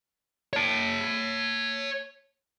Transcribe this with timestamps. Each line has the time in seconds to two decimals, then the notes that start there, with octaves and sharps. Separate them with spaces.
0.53 C#5 A5